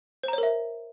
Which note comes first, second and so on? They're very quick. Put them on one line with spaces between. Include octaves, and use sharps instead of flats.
C5 A#5 C#5 A#4 E5